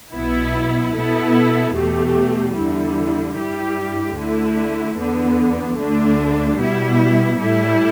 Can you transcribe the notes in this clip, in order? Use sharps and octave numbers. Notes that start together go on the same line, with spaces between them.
B1 B2 B3 E4
B2 B3 E4 A4
E2 B2 A3 G4
E2 D3 G3 E4
G2 G3 E4 G4
D2 D3 A3 E4
E2 D3 B3 D4
D2 D3 A3 D4
B2 G3 B3 E4
A2 G3 E4 A4